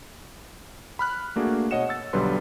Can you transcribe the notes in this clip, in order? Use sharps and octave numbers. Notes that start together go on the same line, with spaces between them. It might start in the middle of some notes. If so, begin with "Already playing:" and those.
B5 F6 F#6
A3 A#3 D4 F#4 G#4
B2 C#5 D#5 F#5 C#7 E7
E6 A6
B1 D3 F#3 G3 B4 C6